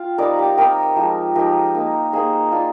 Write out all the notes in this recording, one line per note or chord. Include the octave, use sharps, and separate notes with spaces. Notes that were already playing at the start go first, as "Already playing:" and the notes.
Already playing: F4 F5 G5
G3 C4 D#4 A#4 D5
G4
G3 C4 D#4 G4 A#4
F3 G#3 D#4
F3 G#3 D#4 G4 A#4
A#3 D#4
A#3 D#4 G#4 C5
A#3 D4 F4